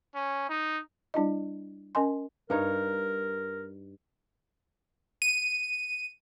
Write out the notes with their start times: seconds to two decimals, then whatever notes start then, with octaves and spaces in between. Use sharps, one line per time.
0.15 C#4
0.49 D#4
1.14 G3 D4 E4 D#5
1.95 C#4 A#4 D#5 G#5 C6
2.50 G2 D#4 A#4 C#5
5.22 D#7